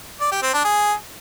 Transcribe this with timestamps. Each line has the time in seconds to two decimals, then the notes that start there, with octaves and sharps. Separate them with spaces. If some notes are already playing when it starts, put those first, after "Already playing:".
0.21 D5
0.32 G4
0.43 C4
0.54 D4
0.65 G#4